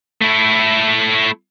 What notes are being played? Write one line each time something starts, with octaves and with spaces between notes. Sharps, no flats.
A3 E4